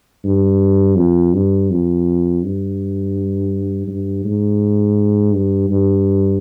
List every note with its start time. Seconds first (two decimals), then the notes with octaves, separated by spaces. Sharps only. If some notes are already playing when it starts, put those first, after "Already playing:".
0.24 G2
0.97 F2
1.34 G2
1.71 F2
2.43 G2
3.88 G2
4.24 G#2
5.33 G2
5.70 G2